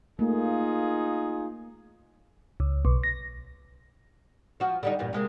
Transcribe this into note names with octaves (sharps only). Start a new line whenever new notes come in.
A3 A#3 D#4 F4 G#4
C#2
B1
A#6
F3 F#4
D3 G3 D#4
E2 G2 A#2
C3 G#3 A#3